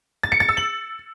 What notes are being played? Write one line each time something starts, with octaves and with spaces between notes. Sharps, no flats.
A6
C#7
A6
E6
F#7